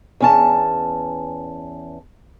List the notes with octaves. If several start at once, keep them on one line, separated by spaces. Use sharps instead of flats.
E2 C#4 A5